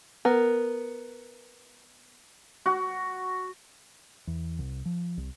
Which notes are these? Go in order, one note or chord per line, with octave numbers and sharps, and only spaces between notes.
B3 A#4
F#4
E2
C2
F3
C2